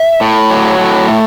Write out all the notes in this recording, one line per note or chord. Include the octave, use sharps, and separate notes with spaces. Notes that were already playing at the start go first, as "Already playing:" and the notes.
Already playing: E5
A2
F#3
A2
A3